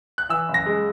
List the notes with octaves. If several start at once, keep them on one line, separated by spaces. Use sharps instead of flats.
F#6
E3 E6
F#1
A#6
G#3